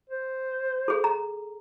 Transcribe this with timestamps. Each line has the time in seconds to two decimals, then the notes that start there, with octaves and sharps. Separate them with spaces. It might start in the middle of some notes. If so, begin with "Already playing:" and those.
0.10 C5
0.88 G#4 A4
1.04 A#5